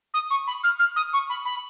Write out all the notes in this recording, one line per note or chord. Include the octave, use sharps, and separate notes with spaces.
D#6
C#6
B5
F6
F6
D#6
C#6
B5
B5